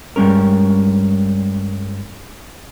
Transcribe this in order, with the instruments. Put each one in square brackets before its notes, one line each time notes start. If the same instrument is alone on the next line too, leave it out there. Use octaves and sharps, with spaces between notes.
[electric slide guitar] G2 G3 G#3 C#4 A#4